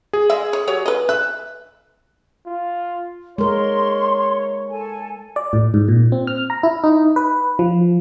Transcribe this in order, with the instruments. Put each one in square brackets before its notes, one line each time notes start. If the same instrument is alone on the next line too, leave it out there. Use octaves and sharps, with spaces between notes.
[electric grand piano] G#4
[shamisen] G#3 D#5 E5
C#5
F#3 G4 C#5
B4 D#5
[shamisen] E5 [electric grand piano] F#6
[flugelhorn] F4
[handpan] G#3 A#4 [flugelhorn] C#5 [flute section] C6
[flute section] A4 G#5
[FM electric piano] D5
A2
G#2
A#2
C4
F6
A#5
E4
D#4
B4
F3